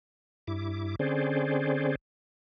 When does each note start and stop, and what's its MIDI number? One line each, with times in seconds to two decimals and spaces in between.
0.48 0.96 43
0.48 0.96 64
0.48 0.96 86
0.99 1.95 50
0.99 1.95 60
0.99 1.95 61
0.99 1.95 68
0.99 1.95 72
0.99 1.95 74